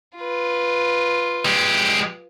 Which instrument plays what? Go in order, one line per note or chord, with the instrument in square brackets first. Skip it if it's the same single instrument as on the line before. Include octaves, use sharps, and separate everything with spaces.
[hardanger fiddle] F4 B4
[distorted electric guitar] G#3 G4